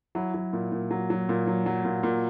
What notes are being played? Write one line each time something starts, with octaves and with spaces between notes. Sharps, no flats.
F#3 E4
F#3
A#2
A#2
F#3
F#3
A#2
F#3
F#3
A#2
A#2